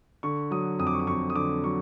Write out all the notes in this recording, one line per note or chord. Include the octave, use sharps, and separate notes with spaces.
D3 C#6
F#3 D#6
F2 D#6
D6
C#6
D6
F2 C#6
D#6
D3 D6
F#3 C#6